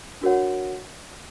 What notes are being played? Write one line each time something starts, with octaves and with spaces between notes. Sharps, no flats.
D4 F#4 A#4 C#5 F#5